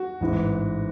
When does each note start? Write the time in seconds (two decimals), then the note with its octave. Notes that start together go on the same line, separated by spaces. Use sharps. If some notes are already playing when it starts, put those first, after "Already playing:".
Already playing: F#4
0.21 A1 G#2 E3